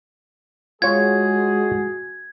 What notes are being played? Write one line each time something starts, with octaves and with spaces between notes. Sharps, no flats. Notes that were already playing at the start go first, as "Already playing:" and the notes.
G#3 F4 F#4 G#4 C#5 G#6